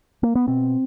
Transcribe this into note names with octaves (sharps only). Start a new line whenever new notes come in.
A#3
B3
B2 C4